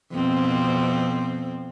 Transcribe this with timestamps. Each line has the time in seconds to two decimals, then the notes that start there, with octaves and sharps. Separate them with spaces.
0.12 F2 B2 C4